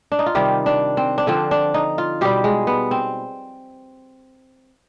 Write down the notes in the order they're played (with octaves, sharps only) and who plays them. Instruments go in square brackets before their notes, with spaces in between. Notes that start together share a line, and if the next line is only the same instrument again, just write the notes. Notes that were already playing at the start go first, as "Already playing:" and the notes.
[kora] D4
D#4
F4
C3 D#3 G3 G4
D4
C4
D4
D3 F3 C4
D4
D#4
F4
B2 G3 G4
G#3
B3
C4